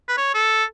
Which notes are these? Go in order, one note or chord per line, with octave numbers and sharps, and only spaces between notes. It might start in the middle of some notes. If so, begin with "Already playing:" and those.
B4
C#5
A4